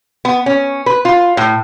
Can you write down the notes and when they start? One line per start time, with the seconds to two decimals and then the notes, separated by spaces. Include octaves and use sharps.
0.25 B3
0.46 C#4
0.86 B4
1.05 F4
1.37 A2